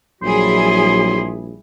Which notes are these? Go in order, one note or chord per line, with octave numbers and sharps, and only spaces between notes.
A#1 F#3 G3 E4 G#4 C6